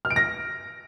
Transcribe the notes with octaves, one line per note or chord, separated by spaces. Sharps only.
F6
D7
A#6